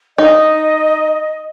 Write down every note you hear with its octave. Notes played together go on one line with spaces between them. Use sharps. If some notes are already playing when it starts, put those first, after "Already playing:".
D#4 D#5